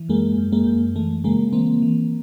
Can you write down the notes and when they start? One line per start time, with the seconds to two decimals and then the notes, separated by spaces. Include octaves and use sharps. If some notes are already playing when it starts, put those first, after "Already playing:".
Already playing: E3
0.09 F#2 G#3 A#3
0.38 F#2
0.52 G#3 A#3
0.67 F#2
0.96 E3 A3
1.24 C#3 G#3 A#3
1.53 E3 A#3 C4
1.82 E3